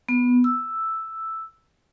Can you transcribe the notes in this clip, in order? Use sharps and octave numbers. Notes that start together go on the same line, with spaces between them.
B3
E6